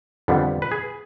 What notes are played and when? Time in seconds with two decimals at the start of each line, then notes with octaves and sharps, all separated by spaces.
0.28 F2 D3 G3 B3
0.62 B4
0.71 G#4